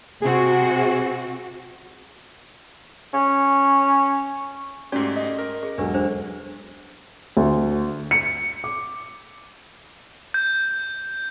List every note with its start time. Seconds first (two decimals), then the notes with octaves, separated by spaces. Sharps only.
0.22 C3 C4 F#4 G#4
3.14 C#4
4.92 G#2 A3 C#4 F#4 G4 D5
5.16 D#5
5.38 A#4
5.63 G#4
5.78 E1 F#3 D4 G4 A4 B4
5.94 D4 G#4 C5
7.37 D2
8.11 C#7
8.64 D6
10.34 G6